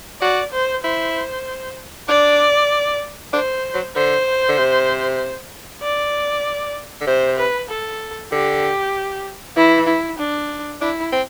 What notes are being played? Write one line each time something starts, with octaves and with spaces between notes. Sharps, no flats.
F#4 D5
C5
E4 C5
D4 D5
D4 C5
F#3
D3 C5
D3
C3
D5
D3
C3 C5
B4
A4
D3 G4
E3 E4
E4
D4
D4 E4
C4